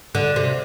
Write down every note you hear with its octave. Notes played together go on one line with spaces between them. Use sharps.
D3
C3